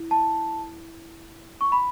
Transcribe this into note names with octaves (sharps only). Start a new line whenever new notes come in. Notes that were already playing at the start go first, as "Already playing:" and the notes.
Already playing: E4
A5
C#6
B5